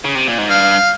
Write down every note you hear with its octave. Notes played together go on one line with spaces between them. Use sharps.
C#3
C3
A#2
G#2
G2 F5